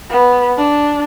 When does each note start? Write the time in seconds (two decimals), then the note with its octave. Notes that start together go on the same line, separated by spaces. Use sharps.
0.11 B3
0.58 D4